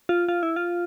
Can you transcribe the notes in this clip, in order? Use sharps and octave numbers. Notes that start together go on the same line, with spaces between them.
F4
F4
E4
F4